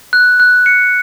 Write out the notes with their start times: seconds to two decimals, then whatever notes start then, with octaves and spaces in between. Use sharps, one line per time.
0.13 F#6
0.40 F#6
0.66 C#7